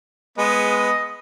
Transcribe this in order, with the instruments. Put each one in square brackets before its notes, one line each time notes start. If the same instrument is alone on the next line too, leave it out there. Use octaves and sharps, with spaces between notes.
[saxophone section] G#3 [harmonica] B3 [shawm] D#5